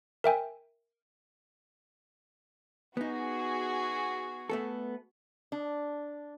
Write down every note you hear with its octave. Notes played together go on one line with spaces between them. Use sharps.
A#4 E5 G5 G#5
B3 D#4 F#4 G#4
A3 B3 A4
D4